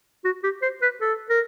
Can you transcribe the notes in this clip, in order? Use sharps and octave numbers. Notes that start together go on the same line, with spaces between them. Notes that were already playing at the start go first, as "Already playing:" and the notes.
F#4
G4
C5
B4
A4
A#4